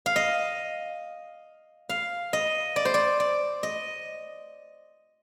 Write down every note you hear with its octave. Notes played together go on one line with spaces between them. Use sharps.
F5
D#5
F5
D#5
D5
C5
D5
D5
D#5